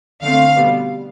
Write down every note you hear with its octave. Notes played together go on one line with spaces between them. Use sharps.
D3 A3 C4 F5
B2 G3 B3